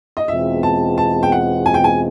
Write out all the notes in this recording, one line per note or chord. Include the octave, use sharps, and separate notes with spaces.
D#5
E2 B2 G#3 C4 F4 E5
A5
A5
G5
F#5
G#5
G5
G#5